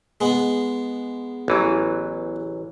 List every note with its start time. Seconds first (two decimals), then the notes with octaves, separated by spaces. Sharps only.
0.21 G#3 B3
1.48 A1 E3 F#3